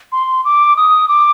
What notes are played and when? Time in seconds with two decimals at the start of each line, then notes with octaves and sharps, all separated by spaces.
0.12 C6
0.45 D6
0.77 D#6
1.09 D6